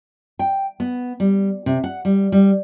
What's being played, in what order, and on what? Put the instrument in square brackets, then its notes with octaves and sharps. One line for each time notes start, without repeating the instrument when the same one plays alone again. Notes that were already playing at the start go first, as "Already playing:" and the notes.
[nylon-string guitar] G5
B3
G3
C3
F#5
G3
G3